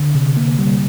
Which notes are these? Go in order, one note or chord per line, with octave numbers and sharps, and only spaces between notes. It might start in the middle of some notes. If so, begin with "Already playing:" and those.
Already playing: D3
C3
A#3
G3